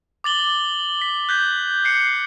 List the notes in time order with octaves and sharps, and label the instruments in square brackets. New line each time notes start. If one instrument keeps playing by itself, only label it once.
[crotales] D6 A6 F#7 G7
B6
F#6 G6 B6
F#6 C7 C#7